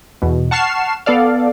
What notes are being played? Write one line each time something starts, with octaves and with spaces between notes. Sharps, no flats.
E2 B2
F#5 A5 C#6 F6 C7 E7
B3 A4 D5 F5